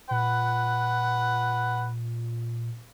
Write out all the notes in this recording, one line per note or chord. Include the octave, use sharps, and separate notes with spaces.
A#2 B4 F#5